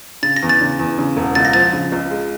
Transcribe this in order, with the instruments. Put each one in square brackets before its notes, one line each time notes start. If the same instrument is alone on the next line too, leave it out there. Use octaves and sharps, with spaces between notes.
[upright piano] C#3 [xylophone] A6
[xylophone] A#6
[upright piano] E2
[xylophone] A6
[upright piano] C#3
E2
C#3
E1
[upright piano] C#2 [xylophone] A6
[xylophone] A#6
[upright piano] F3 [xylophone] A6
[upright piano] C#3
C#2
G#3